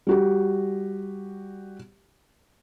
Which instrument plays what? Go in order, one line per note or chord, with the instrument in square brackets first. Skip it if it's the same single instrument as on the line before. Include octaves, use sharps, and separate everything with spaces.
[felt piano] G3 F#4 G4